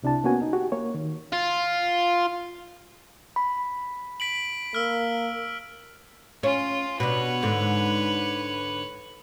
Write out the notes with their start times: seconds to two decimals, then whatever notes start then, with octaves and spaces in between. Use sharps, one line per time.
0.02 C2 C3 D4 E4 A5
0.24 A#3 B3 C#4 F#4 G#5
0.42 D#4
0.53 F#4 G4
0.72 A#3 C#5
0.95 D#3
1.33 F4
3.36 B5
4.20 B6 D7 F#7
4.75 A#3 E6 F6
6.43 C#4 F4
7.00 B2 D4 B4 C#5
7.43 G#2 D3